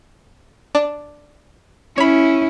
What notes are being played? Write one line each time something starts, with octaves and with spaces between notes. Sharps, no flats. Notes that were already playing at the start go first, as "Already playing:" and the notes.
D4
C#4 E4 C#5 B5